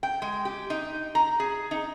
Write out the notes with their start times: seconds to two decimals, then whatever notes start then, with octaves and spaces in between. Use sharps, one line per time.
0.03 G5
0.22 G#3
0.45 G4
0.70 D#4
1.15 A#5
1.40 G#4
1.71 D#4